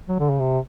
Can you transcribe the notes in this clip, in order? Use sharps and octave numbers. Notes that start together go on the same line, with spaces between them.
F#3
D3
C#3
C3